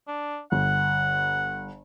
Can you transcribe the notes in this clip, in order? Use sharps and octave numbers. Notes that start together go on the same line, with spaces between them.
D4
G1 F#5